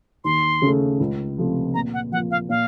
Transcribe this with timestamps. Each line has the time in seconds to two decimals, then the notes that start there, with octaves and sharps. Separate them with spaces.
0.24 D#2 C6
0.62 C#3 A3
1.00 C#2
1.38 C3 F3 A3
1.74 A#2 A#5
1.94 F#5
2.12 F3 A#3 F4 F#5
2.31 F5
2.49 A#2 F5